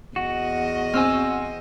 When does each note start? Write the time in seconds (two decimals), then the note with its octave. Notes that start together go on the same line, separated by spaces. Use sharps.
0.16 E2 F#4 D#5
0.94 C4 G#5 E6 F6